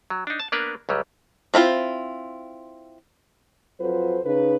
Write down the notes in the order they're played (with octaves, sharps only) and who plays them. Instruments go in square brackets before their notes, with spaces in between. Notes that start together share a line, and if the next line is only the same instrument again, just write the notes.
[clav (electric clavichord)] F#3
D4 D#4
A5
A#3 B3 D4 A#4 B4
C#2 F#3 G3
[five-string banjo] C4 E4 F4 C5
[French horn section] F2 F#3 F4 A4 B4 C5
C#3 D#4 B4